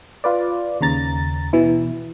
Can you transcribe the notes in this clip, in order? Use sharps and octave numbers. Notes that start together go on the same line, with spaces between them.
F4 B4 D5
D#2 C#3 A#5 A6
B2 E3 E4